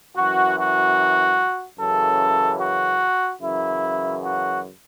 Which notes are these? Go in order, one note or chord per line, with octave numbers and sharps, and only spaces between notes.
F#2 E3 F#4
F#4
F#2 C#3 E3 A4
F#4
F#2 C#3 E3 E4
F#4